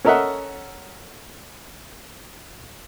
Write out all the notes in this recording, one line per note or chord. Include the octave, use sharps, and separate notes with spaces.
C#4 A4 A#4 D#5 E5 F#5